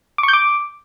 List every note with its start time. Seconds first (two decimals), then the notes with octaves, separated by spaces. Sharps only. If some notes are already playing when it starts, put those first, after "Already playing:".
0.18 D6
0.23 C#6
0.28 G6
0.33 D6